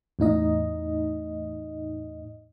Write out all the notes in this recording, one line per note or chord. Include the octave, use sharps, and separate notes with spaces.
E2 A2 D#4 D#5